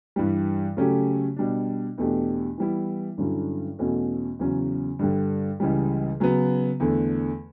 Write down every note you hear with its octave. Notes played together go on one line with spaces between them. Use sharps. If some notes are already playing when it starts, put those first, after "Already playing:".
G2 E3 G3
C#3 F#3 A3 C#4 G4
B2 G3 D4
E2 B2 A3 D4 G4
E3 G3 B3 E4
G2 D3 F#3 C#4 E4
E2 B2 A3 C#4 F#4
E2 C#3 F#3 C#4
G2 D3 G3
C#2 C#3 E3 G3
C#3 F#3 B3
E2 D3 A3